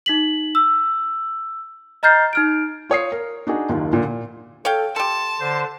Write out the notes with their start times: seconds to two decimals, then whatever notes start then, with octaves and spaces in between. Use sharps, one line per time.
0.06 D#4 B6 F#7
0.55 E6
2.03 D#5 A#5 F6 G6 A6 C7
2.33 D#4 F6 D7
2.89 F4 C#5 D#6 C7
3.12 A#4
3.47 D4 D#4 F#4 G#4
3.69 F#1 D#2 D#3 F4
3.93 A#2 D3 F3
4.05 A#2
4.65 A4 C#5 F5 G5
4.96 G4 A4 A5 C6
5.40 D3 C5